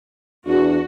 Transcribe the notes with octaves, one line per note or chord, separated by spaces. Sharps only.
E2 D4 F#4